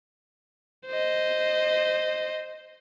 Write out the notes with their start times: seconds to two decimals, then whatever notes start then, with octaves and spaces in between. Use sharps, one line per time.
0.87 C5 D#5